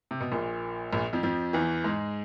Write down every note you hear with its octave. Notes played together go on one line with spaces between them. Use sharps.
C3
B2
A#1 A#2
A#1 A#2
F2 F3
F2 F3
E2 E3
G#2 G#3